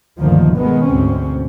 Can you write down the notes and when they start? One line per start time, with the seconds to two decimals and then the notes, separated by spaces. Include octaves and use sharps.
0.17 G1 D2 A#2 D#3 F3
0.55 B2 D#3 G#3 B3
0.87 D2 G#2 B2 C4 C#4